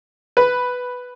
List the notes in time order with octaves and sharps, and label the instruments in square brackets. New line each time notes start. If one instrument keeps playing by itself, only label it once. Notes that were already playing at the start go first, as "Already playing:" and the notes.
[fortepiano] B4